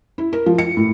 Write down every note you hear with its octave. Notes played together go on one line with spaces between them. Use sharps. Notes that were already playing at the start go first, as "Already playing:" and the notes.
E4
A#4
F3
C#7
A2